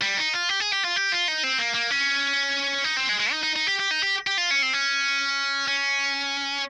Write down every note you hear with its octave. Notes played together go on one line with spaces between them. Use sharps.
G3
D#4
F4
G4
G#4
G4
F4
G4
F4
D#4
C4
A#3
A#3
C#4
D#4
C4
G#3
G#3
D#4
D#4
D#4
G4
G4
D#4
G4
G4
F4
C#4
C4
C#4
C#4